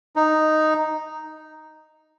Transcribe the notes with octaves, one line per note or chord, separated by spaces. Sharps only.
D#4